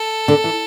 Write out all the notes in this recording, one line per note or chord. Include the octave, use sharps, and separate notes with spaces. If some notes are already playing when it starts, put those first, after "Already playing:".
Already playing: A4
D3
E3